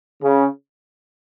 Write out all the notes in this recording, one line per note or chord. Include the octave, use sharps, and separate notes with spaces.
C#3